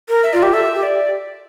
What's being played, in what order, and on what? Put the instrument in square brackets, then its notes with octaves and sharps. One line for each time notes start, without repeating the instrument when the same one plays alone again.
[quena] A#4
[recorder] E5
[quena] F4 [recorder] D5
[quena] G4 [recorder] E5
[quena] A4 [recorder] E5
[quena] G4
[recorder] D5